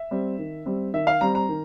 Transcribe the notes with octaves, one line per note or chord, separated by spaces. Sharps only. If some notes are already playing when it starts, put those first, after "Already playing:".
Already playing: E5
G3 C4
D#3
G3 C4
D#3 E5
F5
G3 C4 A#5
A#5
D#3